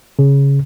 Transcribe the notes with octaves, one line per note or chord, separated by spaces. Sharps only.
C#3